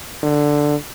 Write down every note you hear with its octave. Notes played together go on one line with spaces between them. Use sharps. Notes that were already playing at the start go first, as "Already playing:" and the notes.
D3